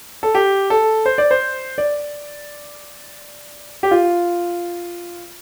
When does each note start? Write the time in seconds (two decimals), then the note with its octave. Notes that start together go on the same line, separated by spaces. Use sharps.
0.23 A4
0.35 G4
0.70 A4
1.06 C5
1.18 D5
1.31 C5
1.78 D5
3.83 G4
3.91 F4